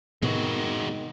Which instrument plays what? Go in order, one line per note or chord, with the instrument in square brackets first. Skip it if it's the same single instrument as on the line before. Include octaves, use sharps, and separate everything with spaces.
[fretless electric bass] A2 C3 B3 [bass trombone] D#3 [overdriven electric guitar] G#3 F#4